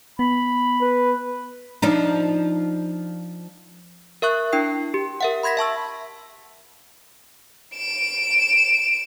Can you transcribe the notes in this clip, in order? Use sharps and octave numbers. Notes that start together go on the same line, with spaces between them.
B3 B5
B4
F3 D4 D#4
A#4 E5 C#6 F#6
D4 E4 G5 C7
G4
A#4 E5 F#5
B5 C6 G#6 A#6 B6
E5 A5 C#6 E6
D7 E7